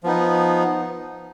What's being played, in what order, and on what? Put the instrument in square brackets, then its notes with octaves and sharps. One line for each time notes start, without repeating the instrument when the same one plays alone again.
[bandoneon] F3 B3 D#4